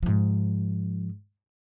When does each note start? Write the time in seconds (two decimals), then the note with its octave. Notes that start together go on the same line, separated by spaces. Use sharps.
0.03 G#2 F3